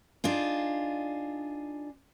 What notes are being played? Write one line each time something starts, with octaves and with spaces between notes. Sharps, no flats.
D4 D#4 F4 G#4